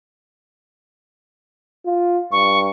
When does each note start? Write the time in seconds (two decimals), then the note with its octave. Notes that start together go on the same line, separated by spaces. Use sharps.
1.85 F4
2.32 G2 C#6